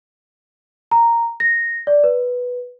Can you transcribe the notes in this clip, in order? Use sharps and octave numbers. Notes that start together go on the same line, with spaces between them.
A#5
A#6
D5
B4